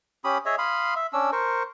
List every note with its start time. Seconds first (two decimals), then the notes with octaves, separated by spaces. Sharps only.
0.24 C#4 G4 B5 D#6
0.46 G#4 C#5 D#5 E5
0.58 F5 B5 C6 D#6
0.96 E5
1.13 C#4 D4 E6
1.32 A#4 C5 C#6